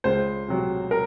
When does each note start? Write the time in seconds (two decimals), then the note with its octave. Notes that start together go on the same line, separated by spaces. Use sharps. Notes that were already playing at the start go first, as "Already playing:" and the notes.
0.04 C#2 C5
0.48 C3 F#3
0.91 A#4